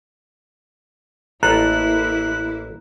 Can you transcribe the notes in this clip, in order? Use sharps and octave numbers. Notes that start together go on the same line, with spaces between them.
A1 A#3 E4 F4 A4 A#5 F#6